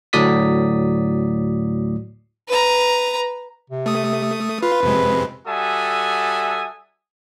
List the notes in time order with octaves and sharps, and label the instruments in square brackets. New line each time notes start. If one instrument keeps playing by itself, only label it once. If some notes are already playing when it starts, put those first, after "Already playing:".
[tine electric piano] D2 A2 F#3 D5 D#6 B6
[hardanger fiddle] B4 A#5
[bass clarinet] C3
[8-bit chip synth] A3 D#6
[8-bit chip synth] F4 [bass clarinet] B4
[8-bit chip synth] F2 C3 G#3
[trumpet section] G3 F#4 A4 E5 G#5 D#6